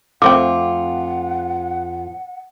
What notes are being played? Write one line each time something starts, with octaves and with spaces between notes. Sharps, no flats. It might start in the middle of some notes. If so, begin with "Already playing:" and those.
F2 A3 C4 F4 F#5 G5 D6